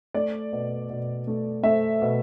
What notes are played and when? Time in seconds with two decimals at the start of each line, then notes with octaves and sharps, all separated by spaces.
0.14 A3 D5
0.52 B2
0.90 B2
1.27 A3
1.63 A3 E5
2.02 B2